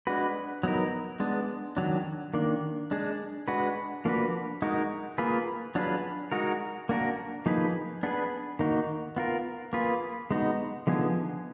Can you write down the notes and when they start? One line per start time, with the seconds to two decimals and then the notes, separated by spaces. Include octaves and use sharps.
0.07 G#3 D4 F#4 B4
0.63 F#3 B3 D#4 A#4
1.20 G#3 B3 D4
1.77 D#3 F#3 D4
2.34 D#3 A#3 D4
2.91 G#3 D4 G#4
3.48 G#3 D4 F#4 B4
4.05 F3 A#3 D4 F#4 B4
4.62 G#3 D#4 F#4 A#4
5.18 A#3 F4 G#4 B4
5.75 F#3 D4 F4 G#4 B4
6.32 G#3 D#4 F#4 A#4
6.89 A#3 D4 F#4 A#4
7.46 F3 A#3 D#4 G#4 B4
8.03 B3 D4 G#4 B4
8.59 D#3 A#3 D#4 F#4
9.16 B3 F4 A#4
9.73 A#3 F4 G#4 B4
10.31 G#3 B3 D#4 F#4
10.87 D3 F3 B3 D#4 G#4